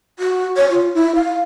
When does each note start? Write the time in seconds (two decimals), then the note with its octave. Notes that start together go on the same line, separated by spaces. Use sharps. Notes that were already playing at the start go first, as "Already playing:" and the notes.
0.19 F#4
0.57 C#5
0.71 F4
0.95 E4
1.15 F5